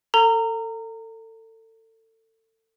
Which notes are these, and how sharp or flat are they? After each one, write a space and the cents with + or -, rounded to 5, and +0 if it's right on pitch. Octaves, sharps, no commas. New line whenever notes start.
A4 +30 A#5 -25